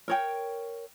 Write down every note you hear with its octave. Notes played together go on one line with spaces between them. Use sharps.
A#4 C#5 G5